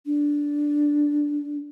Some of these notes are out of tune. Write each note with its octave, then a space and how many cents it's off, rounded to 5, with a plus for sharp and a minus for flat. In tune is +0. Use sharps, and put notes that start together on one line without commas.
D4 -5